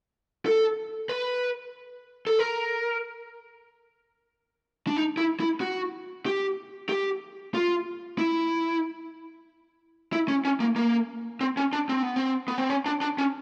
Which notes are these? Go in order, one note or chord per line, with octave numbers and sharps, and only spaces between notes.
A4
B4
A4
A#4
D4
D#4
E4
E4
F#4
G4
G4
F4
E4
E4
C#4
C#4
A#3
A#3
C4
C#4
D4
C4
B3
C4
B3
C4
C#4
D4
D4
C#4